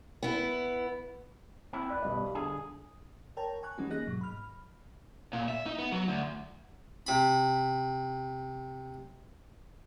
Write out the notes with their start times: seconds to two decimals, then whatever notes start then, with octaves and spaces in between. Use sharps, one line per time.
0.23 B3 E4
1.73 B3 C4 E4
1.90 B4 D5
2.03 B1 G3 D#5
2.35 D3 G#4
3.37 A#4 C#5 G5 A5 A#5
3.63 G#5 C#6 F#6
3.78 E3 G3 G#3 C#4 D#4 F#4
3.90 A#3 G#4 D#5 F#6 A#6
4.07 G#2 B2 F#3
4.21 B5 F6
5.33 A#2
5.48 E5
5.66 D#4
5.79 B3
5.92 F#3
6.08 D2
7.07 C3 B5